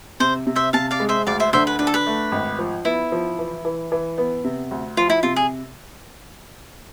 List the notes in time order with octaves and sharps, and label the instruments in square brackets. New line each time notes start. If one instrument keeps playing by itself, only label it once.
[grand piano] C3 [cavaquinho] C5
[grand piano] C3
[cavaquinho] C5 E5
[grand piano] C3 [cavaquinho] F5 A5
[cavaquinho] D5 F5
[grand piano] G#3
[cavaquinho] C5 E5
[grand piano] D2 [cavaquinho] D5 F5
[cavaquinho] C5 E5
[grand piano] D3 [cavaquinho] C5 E5
[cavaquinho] B4
[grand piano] D4 [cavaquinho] B4
[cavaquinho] A4
B4
[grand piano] A3
G#1
F3
[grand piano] B3 [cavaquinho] E4
[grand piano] F3
E3
E3
E3
B3
C3
D2
[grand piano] F3 [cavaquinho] F4
[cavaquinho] E4
[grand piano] C3 [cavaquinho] F4
[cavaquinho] G#4